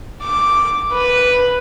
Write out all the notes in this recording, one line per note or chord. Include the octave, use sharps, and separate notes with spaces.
D6
B4